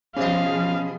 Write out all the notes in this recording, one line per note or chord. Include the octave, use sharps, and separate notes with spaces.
B2 F3 C#4 G#4 D#5 F5